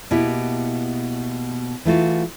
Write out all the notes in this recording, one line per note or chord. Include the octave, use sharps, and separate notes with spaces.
B2 A#3 E4 G4
E3 A3 F4 F#4